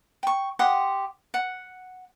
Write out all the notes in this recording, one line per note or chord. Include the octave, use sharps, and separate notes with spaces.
G5 C#6
G4 F#5 C6 D#6
F#5